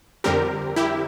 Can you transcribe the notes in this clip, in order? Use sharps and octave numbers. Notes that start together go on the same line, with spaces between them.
F2 D3 G3 C4 G4 A#4
E4 G4